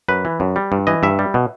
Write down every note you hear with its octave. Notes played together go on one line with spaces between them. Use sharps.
F#2 B4
E3
F#2
G3
G2
E3 D#5
G2 E5
G3
B2